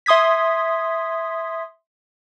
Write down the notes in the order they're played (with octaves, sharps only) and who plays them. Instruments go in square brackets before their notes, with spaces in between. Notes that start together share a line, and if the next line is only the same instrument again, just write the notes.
[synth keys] E5 C6 D#6 G#6 B6